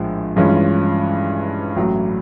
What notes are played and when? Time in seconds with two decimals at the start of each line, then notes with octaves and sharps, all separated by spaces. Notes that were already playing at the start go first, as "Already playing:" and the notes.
Already playing: A#1 A2 F3 G#3
0.36 G2 E3 G#3 C#4 F4
1.76 A1 A2 F#3